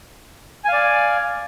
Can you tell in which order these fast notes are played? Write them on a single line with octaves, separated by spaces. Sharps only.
G#5 F5 D5